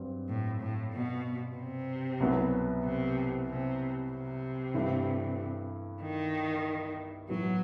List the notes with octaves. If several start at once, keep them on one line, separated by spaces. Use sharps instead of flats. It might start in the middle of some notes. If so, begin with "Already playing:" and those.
Already playing: G2 F#3 C4
A2
A2
B2
C3
C2 B2 F#3 B3
C3
C3
C3
G2 E3 A3 E4
D#3
A2 E3 F#3 B3 F#4